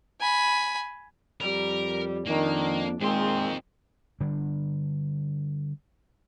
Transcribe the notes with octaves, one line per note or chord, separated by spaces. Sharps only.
G#5 B5
F2 G3 A#4
F2 D#3 A#3 D4
F2 A#2 D#3 G#3 C4 G#4 C6
D3 G3 D4